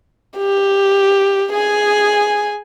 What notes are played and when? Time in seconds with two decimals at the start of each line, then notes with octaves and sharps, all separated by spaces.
0.38 G4
1.53 G#4 G#5